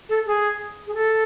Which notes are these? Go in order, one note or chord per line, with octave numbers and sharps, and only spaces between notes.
A4
G#4
G#4
A4